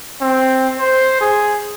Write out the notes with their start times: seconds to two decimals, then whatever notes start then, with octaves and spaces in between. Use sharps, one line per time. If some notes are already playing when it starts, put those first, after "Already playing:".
0.21 C4
0.80 C5
1.21 G#4